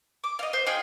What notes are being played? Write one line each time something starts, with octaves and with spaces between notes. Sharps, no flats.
D6
D#5 F5
C5
F4 G#4 D#5 G5